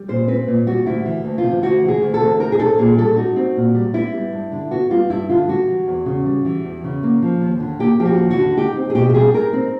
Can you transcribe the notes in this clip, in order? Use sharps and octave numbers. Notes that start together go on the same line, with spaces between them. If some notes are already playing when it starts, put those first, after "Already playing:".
Already playing: G3
A#2 C5
C4 B4
A#2
G3 F#4
D2 E4
E3
D2
F4
C3
D2 F#4
E3
G#4
D2
A4
C3
D#4 A#4
G#4
C4 A4
A#2 G#4
G3 A4
D#4 F#4
C4
A#2
G3
B3 E4
G3
G2
D3
B3 F#4
G3 F4
G2 E4
D3 F4
G3 F#4
E3
E2
C#3
G3
E3
E2
C#3
A#3
F3
D#2
D3
A#3 G4
F3 G4
F#4
D#2
F#4
D3
D#4 G4
C4
G#4
B2 G4
G4
G3 G#4
D#4 A#4
C4